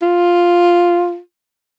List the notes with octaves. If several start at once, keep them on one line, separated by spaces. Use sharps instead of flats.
F4